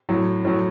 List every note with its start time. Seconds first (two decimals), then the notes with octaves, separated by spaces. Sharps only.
0.09 A2 F#3
0.45 A2 F#3 C#4